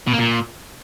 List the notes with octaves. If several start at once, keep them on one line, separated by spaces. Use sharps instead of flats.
B2
A#3
A#2